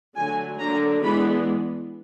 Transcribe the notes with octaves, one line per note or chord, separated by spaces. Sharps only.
D3 F#3 A3 G#5
D3 F#3 A#3 D4 A#5
E3 G#3 B3 D4 B5